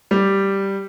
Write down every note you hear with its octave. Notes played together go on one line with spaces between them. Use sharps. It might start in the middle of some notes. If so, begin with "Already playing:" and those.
G3